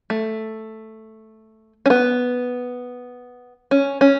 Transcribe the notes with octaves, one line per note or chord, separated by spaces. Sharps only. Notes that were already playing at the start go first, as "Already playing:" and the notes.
A3
C#4
B3
C#4
C#4